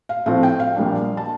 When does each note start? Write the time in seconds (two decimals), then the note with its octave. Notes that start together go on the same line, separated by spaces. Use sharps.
0.09 F5
0.26 A2 F3 C4 F5
0.43 G5
0.60 F5
0.76 A#1 A#2 G3 D4
1.17 A5